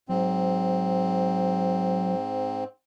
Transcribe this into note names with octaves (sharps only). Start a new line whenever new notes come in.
G#2 F#3 C4